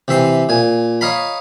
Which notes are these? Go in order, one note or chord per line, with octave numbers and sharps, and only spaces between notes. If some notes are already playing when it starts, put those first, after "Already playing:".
C3 E3 E5 C6
A#2 G#5
C#5 D#5 F5 A#5 B5